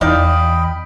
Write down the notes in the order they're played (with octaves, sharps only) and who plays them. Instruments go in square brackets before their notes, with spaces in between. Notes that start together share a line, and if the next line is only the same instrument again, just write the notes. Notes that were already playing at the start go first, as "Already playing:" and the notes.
[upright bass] E2 [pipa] D#4 D5 F5 [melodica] D#5 G5 B5